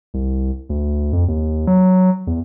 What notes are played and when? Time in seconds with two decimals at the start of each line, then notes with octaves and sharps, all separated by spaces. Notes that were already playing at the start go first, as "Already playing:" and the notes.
0.14 C2
0.69 D2
1.13 F2
1.28 D#2
1.67 F#3
2.27 E2